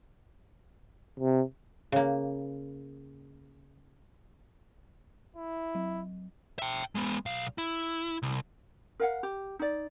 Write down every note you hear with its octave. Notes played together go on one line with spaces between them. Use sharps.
C3
C#3 A#3
E4
F#3
E5 G5
G#3 B3
B1 F5
E4
C2
A#4 F5 F#5
G4
D#4 D5